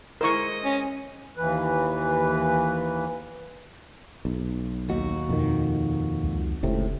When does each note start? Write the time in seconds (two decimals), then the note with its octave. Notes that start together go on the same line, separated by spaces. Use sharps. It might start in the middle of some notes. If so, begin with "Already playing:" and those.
0.21 G#3 E4 A#4 C5 D#5 C#6
0.64 C#4
1.37 D#2 E3 B4
4.25 B1
4.89 D#2 F#4
5.29 F2 B2 D#3
6.23 C#2
6.63 F1 C#2 A2 C3